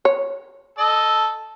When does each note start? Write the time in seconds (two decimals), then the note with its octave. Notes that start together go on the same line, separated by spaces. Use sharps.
0.05 C#5
0.78 A4 D#5